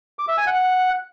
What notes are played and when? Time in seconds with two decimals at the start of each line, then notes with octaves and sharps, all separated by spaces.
0.19 D6
0.28 E5
0.37 G#5
0.47 F#5